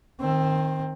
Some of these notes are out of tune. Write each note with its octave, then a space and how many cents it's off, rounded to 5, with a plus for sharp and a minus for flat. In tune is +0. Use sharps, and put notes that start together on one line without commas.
D#3 -5 C4 +15